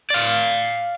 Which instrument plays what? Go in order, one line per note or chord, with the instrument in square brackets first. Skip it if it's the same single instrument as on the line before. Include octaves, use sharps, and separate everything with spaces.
[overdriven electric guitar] D5 F5